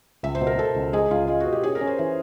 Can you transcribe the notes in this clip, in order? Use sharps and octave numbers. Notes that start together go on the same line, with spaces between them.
C#2 E5
C5
B2
A#4
B2 A4
C#2
G#3 G#4
C#2 F4
G#3 F4
F#4
B2
G4
C#4 G#4
A#4
C#4
C5
E3 C5